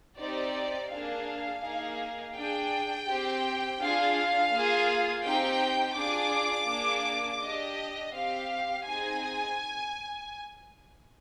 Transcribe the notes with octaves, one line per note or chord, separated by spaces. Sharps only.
C4 D#4 G4 D5
A#3 D4 G#4 F5
A#3 D#4 G#4
D4 G#4 G5
C4 G4
D4 F4 G#4 F5
A#3 F4 G#4
C4 D#4 G4 G5
D4 F4 G#4 D6
A#3 D4 G#4
D4 G4 D#5
C4 G4 F5
C4 D#4 G#4 G#5